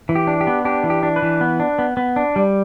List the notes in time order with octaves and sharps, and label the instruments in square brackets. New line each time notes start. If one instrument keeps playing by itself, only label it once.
[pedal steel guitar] E3
G4
D4
G4
B3
D4 G4
E3
G4
D4
B4
E3
B3
D4
B3
B3
D4
G3